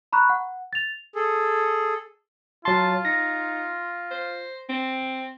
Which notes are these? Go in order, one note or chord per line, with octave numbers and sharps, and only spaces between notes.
A#5 B5 C#6 F#6
F#5
A6 F7
G#4 A4
F#3 F4 A5 C6
D#4 A#6
C5
C4